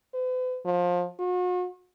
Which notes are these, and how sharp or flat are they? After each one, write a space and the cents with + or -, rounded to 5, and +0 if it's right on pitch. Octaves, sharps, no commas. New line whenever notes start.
B4 +45
F3 +25
F#4 -40